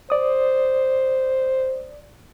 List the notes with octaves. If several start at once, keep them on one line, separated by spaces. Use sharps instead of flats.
C5 D5 D#6